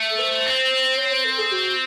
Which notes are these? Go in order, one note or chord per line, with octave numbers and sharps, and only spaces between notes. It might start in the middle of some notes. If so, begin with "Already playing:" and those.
Already playing: A3
A4
C5
C4
C#5
C5
A4
G#4
F#4